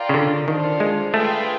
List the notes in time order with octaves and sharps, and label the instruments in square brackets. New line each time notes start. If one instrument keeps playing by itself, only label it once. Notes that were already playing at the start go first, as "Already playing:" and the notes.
Already playing: [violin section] F4 A#4 D5 G5
[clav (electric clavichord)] C#3
D3
[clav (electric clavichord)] D#3 [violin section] D4 F4 A4 C5
[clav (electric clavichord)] G#3
[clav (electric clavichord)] A3 [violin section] F4 G#4 B4 E5 G5